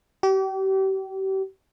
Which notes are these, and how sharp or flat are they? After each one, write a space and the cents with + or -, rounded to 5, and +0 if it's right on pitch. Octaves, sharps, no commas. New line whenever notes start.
G4 -40